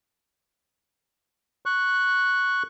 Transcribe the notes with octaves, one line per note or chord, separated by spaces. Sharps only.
C#6 F#6